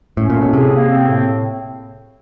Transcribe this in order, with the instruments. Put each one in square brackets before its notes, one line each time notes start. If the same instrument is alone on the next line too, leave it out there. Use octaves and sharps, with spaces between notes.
[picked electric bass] A2 [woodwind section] C#4
[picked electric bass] A#2
[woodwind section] A2
[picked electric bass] B2
[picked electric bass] C3 [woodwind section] G#4
[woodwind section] A#3
C4
A2